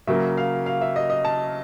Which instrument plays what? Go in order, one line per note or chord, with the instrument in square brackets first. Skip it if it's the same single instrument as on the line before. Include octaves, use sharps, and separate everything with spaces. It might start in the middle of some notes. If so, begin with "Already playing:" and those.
[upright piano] C#3 F#3 A#3 E5
F5
F5
E5
D#5
D#5
A5